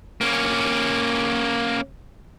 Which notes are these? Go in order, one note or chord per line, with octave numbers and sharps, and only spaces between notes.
A#3 C#4